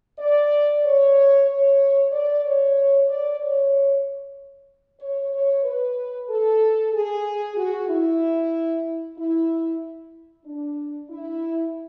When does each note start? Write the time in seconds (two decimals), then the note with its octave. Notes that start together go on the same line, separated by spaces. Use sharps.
0.19 D5
0.84 C#5
1.47 C#5
2.12 D5
2.44 C#5
3.08 D5
3.40 C#5
5.00 C#5
5.33 C#5
5.64 B4
6.29 A4
6.93 G#4
7.56 F#4
7.89 E4
9.17 E4
10.45 D4
11.10 E4